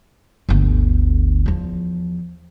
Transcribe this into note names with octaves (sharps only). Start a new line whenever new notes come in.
G1 D2
E2 F3